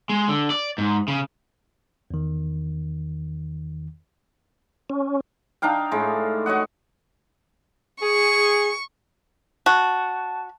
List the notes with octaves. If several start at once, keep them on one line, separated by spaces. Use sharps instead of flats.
G#3
D3
D5
G#2
C#3
E2 D#3
C#4
D4 D#4 F5 G5
A2 G#3
F#4 C#5 D#5 F#5
G#4 C#6
F#4 A5